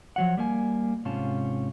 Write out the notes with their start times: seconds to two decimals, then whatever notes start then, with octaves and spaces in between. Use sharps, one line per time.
0.16 F3 F#3 F#5
0.37 G3 A#3 G#5
1.05 G#2 C3 C#4 F4 A5